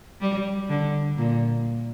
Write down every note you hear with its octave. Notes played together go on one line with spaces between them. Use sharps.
G3
D3
A#2